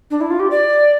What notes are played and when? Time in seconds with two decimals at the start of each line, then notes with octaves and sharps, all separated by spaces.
0.11 D4
0.21 E4
0.31 F4
0.40 G4
0.51 D5